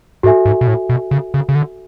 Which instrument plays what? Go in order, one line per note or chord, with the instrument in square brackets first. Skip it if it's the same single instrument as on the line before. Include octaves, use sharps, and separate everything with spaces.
[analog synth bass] G#2 [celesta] F#4 A4 E5 G#5
[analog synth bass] G#2
B2
A2
B2
C#3
C#3
C#3
D3